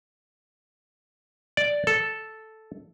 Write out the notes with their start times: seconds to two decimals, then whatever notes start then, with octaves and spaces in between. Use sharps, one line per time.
1.57 D5
1.87 A4